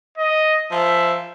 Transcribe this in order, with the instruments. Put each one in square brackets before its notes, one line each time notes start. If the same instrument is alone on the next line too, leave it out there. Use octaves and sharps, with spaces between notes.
[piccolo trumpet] D#5
[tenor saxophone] F3 [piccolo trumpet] E5